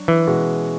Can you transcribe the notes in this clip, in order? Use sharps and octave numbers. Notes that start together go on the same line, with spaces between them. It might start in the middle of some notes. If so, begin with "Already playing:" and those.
Already playing: F#3 D4
E3
B2 G#3 C#4 F#4